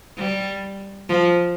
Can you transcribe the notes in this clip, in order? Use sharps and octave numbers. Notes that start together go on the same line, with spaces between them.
G3
F3